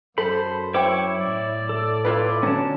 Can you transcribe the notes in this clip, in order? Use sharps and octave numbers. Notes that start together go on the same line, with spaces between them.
F#2 A4 C5 B5
E4 C5 C#5 G5 C#6 D6
A2 D5
A4
E4 F4 B4 D5
D3 F#3 C#4 D4 A5